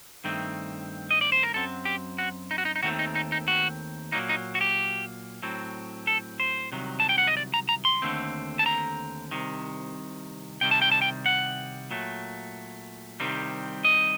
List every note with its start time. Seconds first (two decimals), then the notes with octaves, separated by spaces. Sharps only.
0.24 G2 D#3 A3 C4
1.11 D#5
1.21 D5
1.32 C5
1.43 A#4
1.54 F#2 F#3 C4 A4
1.85 G4
2.18 F#4
2.51 D#4
2.58 F#4
2.65 D#4
2.76 D#4
2.83 D#2 D#3 A3 C4 F#4
2.99 D#4
3.15 D#4
3.32 D#4
3.48 F#4
4.12 A#2 F#3 A#3 D#4
4.29 D#4
4.55 F#4
4.61 G4
5.43 A2 F#3 C4
6.07 A4
6.40 C5
6.72 C2 C3 D#3 F#3
7.00 A5
7.09 G5
7.18 F#5
7.27 D#5
7.37 D5
7.54 A#5
7.69 A#5
7.85 C6
8.02 D#2 D3 A3 C4
8.59 A5
8.66 A#5
9.31 C2 C3 D#3
10.61 C2 C3 D#3 G3 G5
10.71 A5
10.82 G5
10.92 A5
11.02 G5
11.26 F#5
11.91 A#2 F#3 A3
13.20 C2 C3 D#3 G3 C4
13.85 D#5